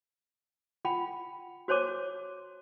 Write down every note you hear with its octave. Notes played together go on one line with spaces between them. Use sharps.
F4 F#5 G5 B5
F#4 C5 C#5 A5 D6